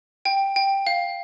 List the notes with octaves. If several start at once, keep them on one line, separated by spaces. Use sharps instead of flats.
G5
G5
F5